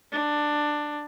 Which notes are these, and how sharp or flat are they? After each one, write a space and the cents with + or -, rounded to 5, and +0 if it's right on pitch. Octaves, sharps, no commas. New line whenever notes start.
D4 +15